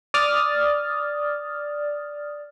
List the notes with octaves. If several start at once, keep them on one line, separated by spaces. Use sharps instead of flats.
D5 D#6 F6 A6